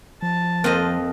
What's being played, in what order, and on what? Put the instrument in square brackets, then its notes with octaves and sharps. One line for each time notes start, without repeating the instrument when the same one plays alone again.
[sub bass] F3 [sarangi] A5
[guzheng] F2 D#5 [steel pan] A#3 C5